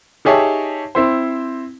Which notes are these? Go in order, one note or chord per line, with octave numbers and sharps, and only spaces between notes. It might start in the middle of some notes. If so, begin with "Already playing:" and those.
D#4 G4 G#4 C#5 E5 A5
C4 E4 C5